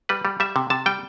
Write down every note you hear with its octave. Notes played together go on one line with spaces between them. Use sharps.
G3 B4
G3
G3 E5
C3
C3 A5
G3 G5